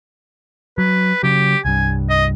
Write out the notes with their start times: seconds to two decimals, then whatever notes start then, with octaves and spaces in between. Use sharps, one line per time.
0.78 F#3 B4
1.23 C#3 F#3 G4
1.65 C2 G2 G#5
2.10 D#5